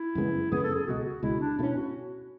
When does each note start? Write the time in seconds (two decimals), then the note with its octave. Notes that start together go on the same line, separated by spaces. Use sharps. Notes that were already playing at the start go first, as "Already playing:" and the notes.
Already playing: E4
0.15 F#2 C#3 G#3 B3
0.51 F#2 C#3 G#3 B3 G#4
0.64 A4
0.75 G#4
0.87 C#2 B2 G#3 F#4
1.05 F#4
1.23 C#2 B2 G#3 E4
1.40 D4
1.58 B2 A3 E4
1.63 C#4
1.76 F#4